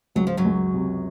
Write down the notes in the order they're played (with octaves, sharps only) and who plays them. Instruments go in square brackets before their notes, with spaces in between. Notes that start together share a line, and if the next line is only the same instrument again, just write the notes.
[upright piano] C#2 [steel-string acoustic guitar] F#3
[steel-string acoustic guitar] F3
F#2 F#3
[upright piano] C#2
C3